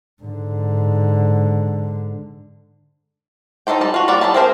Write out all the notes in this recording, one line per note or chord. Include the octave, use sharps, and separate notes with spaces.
G#2 D3
D#4 F4 A4 C5 G5
G3 A5
F4 F#4
G3 A#3 F4 D5 F#5
G3 E4 G#4 A5
C4 F4 G#4 A#4 C5